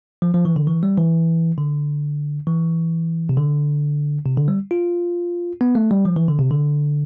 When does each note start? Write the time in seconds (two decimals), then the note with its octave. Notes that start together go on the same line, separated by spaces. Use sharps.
0.22 F3
0.34 F3
0.45 E3
0.56 D3
0.67 E3
0.83 G3
0.97 E3
1.58 D3
2.47 E3
3.29 C3
3.37 D3
4.26 C3
4.37 D3
4.48 G3
4.71 F4
5.61 B3
5.75 A3
5.91 G3
6.05 F3
6.16 E3
6.28 D3
6.39 C3
6.51 D3